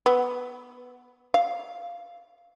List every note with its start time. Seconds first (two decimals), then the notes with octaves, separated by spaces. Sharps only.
0.06 B3
1.34 F5